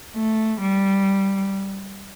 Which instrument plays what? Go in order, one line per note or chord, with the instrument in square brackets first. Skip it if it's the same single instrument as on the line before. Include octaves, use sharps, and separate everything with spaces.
[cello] A3
G3